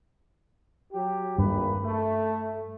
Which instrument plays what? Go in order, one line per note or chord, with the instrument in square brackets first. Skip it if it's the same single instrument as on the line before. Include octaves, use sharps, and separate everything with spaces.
[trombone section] F#3 G4
[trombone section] G#1 A#3 B4 [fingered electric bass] G2
[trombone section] A3